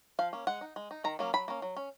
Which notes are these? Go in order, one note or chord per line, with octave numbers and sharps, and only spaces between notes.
F3 F5
A#3 C#4
G#3 F#5
D#4
G#3
D#4
D#3 A#5
F#3 A#3 C#4
F#3 B5
A#3 C#4
F#3
C#4